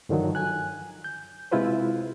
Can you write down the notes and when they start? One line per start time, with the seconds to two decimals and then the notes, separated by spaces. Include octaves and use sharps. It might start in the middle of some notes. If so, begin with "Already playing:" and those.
0.09 G2 D3 D#3 F3 F#3
0.35 G#5 F#6
1.04 G6
1.52 C3 G#3 E4 F4 B4 C5